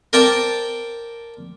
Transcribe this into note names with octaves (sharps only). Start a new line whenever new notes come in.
A#4 C5 D5 G5 A5 A#5